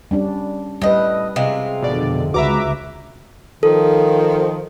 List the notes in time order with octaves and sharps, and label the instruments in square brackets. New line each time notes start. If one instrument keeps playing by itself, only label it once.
[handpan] G3 C#4 D4
[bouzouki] A2 D#5 [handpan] G3 B4
[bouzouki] C3 G#3 F4
[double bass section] F2 D3 [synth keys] B2 D5
[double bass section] C#2 [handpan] F#4 B4 [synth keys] E5 A#5 D6
[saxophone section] D#3 F3 [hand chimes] A4